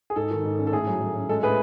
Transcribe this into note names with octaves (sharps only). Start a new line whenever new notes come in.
G#4
G#2 A4
D#3
G#2
C#4
A4
A2 G#4
F#3
F#3
C#4
G#3 A4
A2 G#4 B4